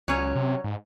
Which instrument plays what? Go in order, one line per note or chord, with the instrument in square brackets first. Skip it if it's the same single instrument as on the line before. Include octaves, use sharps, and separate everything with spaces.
[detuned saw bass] C#2 [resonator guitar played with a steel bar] F#3 C#4
[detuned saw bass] C3
G#2